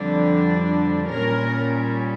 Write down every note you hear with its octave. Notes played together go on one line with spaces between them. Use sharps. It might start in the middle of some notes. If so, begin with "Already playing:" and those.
Already playing: F2 D3 G3 D4
A#2 G3 C#4 A#4